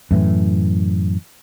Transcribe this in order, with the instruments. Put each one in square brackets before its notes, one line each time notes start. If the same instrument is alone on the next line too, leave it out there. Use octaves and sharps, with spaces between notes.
[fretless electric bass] F#2 A2 E3